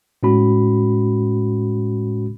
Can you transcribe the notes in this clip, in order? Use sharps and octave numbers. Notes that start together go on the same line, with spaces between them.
A2 G#3 C#4 F#4 B5